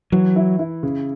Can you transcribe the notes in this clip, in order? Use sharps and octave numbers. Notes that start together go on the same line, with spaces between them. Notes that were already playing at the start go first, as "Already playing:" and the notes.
E3 F#3
E4
E4
C#3